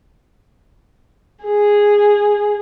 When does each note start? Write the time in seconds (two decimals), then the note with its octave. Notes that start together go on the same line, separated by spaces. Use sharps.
1.43 G#4